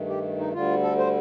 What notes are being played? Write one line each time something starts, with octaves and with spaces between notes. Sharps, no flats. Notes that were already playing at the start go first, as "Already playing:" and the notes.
Already playing: G2 D#3 A3
G4
D#4
D2 D3 G3 F4
A4
C5